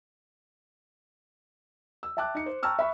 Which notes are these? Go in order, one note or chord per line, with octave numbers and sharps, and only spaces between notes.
E6
E5 G5 A5 D6 F#6
D#4 C#7
C5
G5 A5 A#5 C#6 E6 F6
E5 B5 C#6